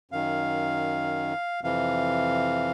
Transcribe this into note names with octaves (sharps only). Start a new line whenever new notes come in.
F#2 D#3 F5
F2 C3 E3 F5